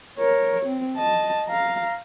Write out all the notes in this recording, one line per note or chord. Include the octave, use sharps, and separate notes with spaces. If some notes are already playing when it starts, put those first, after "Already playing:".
A#4 C#5
C4
D#5 A5
F5 A#5